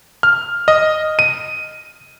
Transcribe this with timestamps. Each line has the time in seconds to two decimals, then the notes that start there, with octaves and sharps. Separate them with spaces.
0.23 F6
0.68 D#5
1.19 D#7